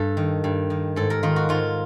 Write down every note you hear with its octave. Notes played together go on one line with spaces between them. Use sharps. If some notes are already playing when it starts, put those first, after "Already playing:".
Already playing: G2 A4
D#3
G2
D#3
G#2 A4
A#4
D#3 F4
F#4
G#2 F4